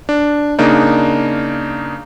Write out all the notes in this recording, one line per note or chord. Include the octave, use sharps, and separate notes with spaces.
D4
C#3 A#3 D4 D#4